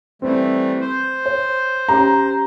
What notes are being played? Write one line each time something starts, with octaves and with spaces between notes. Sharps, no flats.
E3 G3 A3 C4
C5
C#5
C#4 G4 A#5